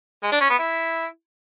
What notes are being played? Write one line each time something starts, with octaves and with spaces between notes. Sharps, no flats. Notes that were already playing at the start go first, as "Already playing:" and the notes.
G#3
D4
C#4
B3
E4